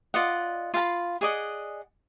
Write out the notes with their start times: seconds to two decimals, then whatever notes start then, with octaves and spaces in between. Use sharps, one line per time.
0.14 F4 D5 D#5 F#5
0.74 F4 F5 A5 B5
1.21 G#4 D5 D#5 F#5